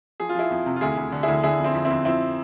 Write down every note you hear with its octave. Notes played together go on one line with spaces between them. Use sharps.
F3 G#4
F4
F3 E4 G#4
F2
C3
F4
D2 E4 G#4
D2
D3
E4 G#4
D2
D3 E4 G#4
F2
C4 E4
F2
C4 E4
F2
F2 C4 E4